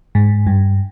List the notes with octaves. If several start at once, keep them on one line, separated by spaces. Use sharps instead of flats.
G#2
G2